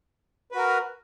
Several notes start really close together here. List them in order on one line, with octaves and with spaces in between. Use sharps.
B4 F#4 A#4